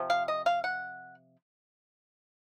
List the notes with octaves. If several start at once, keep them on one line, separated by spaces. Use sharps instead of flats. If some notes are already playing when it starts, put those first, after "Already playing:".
Already playing: C3 F3
F5
D#5
F5
F#5